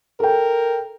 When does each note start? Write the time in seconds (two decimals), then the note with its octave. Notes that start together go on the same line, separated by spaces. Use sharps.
0.20 A4 A#4 G5